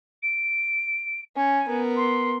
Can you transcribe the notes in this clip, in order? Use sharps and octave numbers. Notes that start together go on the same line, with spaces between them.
D7
C#4 G#5
B3 A#4
C6